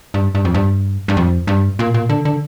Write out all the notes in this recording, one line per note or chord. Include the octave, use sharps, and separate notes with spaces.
G2
G2
F2
G2
G2
F2
G2
A#2
A#2
D3
D3